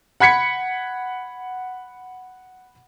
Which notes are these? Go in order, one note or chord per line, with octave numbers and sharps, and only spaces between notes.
F#5 B5 G#6 B6 C#7